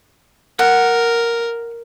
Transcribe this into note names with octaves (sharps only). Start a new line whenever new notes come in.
A#4 F#5